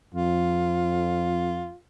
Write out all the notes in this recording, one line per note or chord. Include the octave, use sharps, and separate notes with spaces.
F2 F4